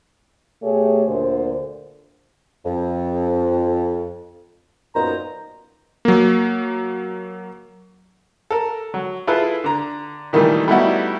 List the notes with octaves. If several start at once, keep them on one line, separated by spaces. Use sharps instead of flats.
B2 A3 G4 G#4 C#5
D2 A#2 D3 C5
F2
F#2 A#2 B3 D#4 C5 A#5
F#3 A#3
A4 A#4
F#3
E4 F4 G#4 A4 B4
D3 A#5
A#2 D#3 E3 G3 A3
G3 A3 B3 D#4 E4 F#4